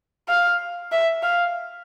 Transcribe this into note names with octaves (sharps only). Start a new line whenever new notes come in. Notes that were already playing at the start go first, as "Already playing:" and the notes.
F5
E5
F5